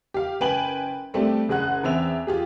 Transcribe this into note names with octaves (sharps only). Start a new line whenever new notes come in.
G4 F5
F#1 B4 G5 G#5 F#7
G3 A3 C4 D4 G4
F#1 G#4 F#5 F#6
E2 C4 E5 F7
F4 G4 G#4